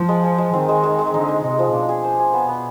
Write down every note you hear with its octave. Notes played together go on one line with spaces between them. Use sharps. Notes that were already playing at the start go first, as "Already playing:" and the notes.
Already playing: F3 F4 C5
G#3
G#3
G#3
D#3 C4
G#3
G#3
G#3
D3 D#4
D#4
C3 D#4
F3
B2 D4
G#4
C5
G#4
B3
B3